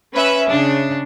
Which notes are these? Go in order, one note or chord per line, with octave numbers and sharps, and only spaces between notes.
C#4 B4 E5
C#3 D4